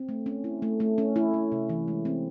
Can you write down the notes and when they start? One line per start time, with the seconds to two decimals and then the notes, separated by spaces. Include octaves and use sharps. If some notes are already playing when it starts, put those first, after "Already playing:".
Already playing: C4
0.09 A3
0.26 C#4
0.44 E4
0.62 A3
0.80 A3
0.98 C#4
1.16 E4
1.34 A3
1.52 C3
1.70 E3
1.88 G#3
2.05 C4